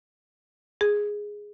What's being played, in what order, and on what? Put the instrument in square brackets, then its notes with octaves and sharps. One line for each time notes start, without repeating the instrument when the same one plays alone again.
[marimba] G#4